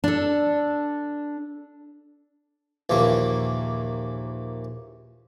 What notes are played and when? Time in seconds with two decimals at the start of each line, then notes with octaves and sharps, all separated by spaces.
0.04 D4 A4
2.90 A#1 D#2 E3 A#3